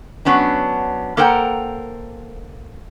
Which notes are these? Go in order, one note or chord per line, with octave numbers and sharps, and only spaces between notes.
F#3 B3 C#4 D4
A#3 A4 A#4 C5 F#5 G5